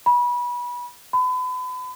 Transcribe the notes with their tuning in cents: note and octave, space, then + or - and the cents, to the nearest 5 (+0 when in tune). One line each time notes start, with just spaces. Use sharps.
B5 -25
B5 +35